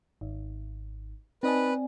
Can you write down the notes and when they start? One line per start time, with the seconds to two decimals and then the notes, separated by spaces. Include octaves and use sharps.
0.21 G#1
1.43 C4 D#4 B4 D5 D#5 G#5 A5